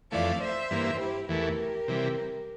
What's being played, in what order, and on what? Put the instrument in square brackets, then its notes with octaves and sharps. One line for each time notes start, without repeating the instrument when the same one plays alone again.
[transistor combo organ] F2 E3 A3 [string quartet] D5 F5
[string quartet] C5 E5
[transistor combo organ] G2 E3 A#3
[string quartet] E4 G4
[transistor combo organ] E2 E3 A3 [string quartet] G4 A#4
[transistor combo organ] C3 E3 G3